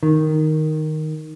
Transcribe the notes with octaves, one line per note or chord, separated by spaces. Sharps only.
D#3